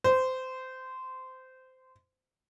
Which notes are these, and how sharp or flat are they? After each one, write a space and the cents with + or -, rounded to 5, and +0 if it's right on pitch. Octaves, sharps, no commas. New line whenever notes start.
C5 -20